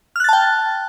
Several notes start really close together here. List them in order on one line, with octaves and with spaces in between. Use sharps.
F6 F#6 A6 A5 G5